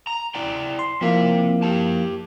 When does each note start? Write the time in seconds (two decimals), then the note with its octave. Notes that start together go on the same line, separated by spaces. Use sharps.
0.07 A#5
0.35 E4 D5 G5
0.79 C6
1.01 F3 A#3 C4 E4 E5
1.63 G4 A5